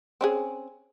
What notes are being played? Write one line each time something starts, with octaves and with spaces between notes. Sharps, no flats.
C4 C#4 G#4